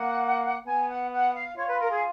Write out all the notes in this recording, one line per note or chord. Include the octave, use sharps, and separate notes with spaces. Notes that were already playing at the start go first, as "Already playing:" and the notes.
Already playing: A#3 F#5
B3 G#5
F#5
F#5
F5
F4 C#5
B4
A#4
G#4